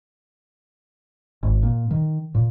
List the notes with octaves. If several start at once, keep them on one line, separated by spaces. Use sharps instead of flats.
G#1
A#2
D#3
A#2